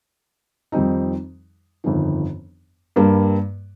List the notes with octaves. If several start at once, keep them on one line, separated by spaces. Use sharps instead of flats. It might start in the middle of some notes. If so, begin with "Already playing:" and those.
F2 D#3 G3 C4 D#4
G1 F2 D#3
G2 G3 A#3